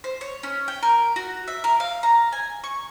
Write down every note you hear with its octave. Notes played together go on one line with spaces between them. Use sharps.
C5
C#5
C#4
G5
A#4
F#4
E5
A#4
F5
A#5
G#5
C#6